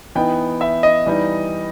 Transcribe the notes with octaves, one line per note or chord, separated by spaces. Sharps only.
E3 B3 D#4 G5
E5
D#5
E3 G3 D#4